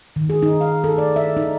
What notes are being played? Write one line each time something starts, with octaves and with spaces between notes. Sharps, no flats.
D#3
G#4
D#4
F5
A4
D5
E5
D#4